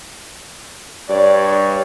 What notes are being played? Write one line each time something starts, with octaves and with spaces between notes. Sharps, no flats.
G2 C#5 D5